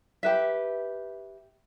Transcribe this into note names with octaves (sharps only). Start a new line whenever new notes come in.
G4 B4 E5